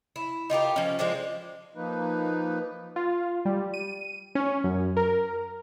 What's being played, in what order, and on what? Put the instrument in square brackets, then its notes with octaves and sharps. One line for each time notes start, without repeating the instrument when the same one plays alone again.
[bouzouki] E4
D#4 F4 G4 A#4
F3 C#4
F3 G#3 C4 D4
[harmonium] F3 A#3 D#4 B4
[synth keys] F4
G3
D#7
C#4
F#2
A#4